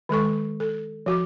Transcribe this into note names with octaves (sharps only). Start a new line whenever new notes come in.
D#3 G#3 A4 C#6
A4
F3 F#4 D6